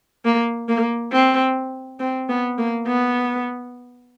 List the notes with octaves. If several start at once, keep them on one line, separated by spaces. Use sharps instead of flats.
A#3
A#3
C4
C4
B3
A#3
B3